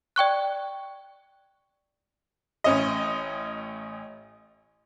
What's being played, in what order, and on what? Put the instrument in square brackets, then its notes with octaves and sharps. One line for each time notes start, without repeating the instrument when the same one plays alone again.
[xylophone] D5 G5 C#6 F#6
[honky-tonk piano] A1 C#4 D#5